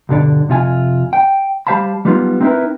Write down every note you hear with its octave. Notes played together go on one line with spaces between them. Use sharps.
B1 G2 D3 D5
F2 C3 F4 G#5
G5
G3 G4 C5 F5 A5 B5
F#3 G3 B3 D#4 F4
C4 D#4 E4 G4 A#4 B4